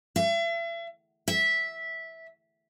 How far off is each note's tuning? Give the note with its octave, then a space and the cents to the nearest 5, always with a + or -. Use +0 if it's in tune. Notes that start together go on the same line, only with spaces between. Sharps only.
E5 +40
E5 -10